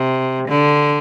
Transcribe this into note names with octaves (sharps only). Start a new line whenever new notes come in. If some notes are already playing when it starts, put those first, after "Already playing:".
Already playing: C3
D3